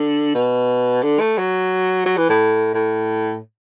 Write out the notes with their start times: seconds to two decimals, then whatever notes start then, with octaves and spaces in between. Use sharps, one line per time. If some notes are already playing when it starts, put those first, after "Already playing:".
Already playing: D3
0.35 B2
1.03 D3
1.20 A3
1.38 F#3
2.06 F#3
2.17 E3
2.29 A2
2.75 A2